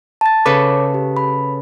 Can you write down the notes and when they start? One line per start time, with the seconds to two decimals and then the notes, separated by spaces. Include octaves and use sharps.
0.21 A5 A6
0.46 C#3 A4 B4 C#5 D6
0.94 G4
1.17 B5